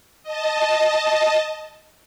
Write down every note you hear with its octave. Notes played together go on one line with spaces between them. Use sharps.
D#5 A5